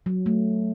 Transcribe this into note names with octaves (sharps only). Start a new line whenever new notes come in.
F#3
A3